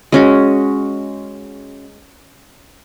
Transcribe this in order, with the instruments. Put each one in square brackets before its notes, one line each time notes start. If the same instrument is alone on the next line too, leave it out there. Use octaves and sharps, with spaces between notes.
[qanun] G#3 C#4 F#4